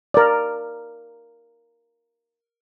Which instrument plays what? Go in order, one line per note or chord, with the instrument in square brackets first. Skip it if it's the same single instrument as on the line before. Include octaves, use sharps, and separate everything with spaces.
[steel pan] A#4 D5